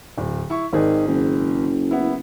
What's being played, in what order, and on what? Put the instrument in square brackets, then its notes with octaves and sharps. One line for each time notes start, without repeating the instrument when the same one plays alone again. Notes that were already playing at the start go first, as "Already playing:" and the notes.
[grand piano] D1
E4 C#6
[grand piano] G#1 G#4 D5 [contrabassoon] D#3
[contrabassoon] F#1
[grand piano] B3 E4